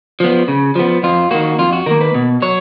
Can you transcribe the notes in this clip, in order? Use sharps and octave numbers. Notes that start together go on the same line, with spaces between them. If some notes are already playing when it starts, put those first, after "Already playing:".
F3 B3
C#3
F3 B3
F2 F4
D#3 A#3 F#4
F2 F4
F#4
D#3 A#3 A#4
B4
B2
F#3 C#5